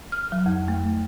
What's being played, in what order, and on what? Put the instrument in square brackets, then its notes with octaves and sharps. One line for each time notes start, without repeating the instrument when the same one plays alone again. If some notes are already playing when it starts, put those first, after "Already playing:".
[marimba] F6
F#3
F2
A3